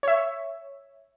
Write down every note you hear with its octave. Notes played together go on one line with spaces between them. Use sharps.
C#5 E5